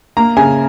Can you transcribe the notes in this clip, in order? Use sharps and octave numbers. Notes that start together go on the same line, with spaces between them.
A#3 A#5
C#3 G#5